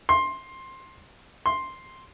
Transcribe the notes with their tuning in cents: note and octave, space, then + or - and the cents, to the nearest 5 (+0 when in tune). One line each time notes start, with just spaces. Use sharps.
C6 +15
C6 +5